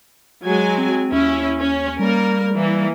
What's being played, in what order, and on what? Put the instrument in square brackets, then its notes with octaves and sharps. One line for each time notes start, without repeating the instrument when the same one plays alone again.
[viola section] F#3 G#3 G#5
[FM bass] C4
[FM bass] D#2 [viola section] C#4 E4
[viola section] C#4
[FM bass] G3 [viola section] A#3 A#4
[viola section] E3 A#3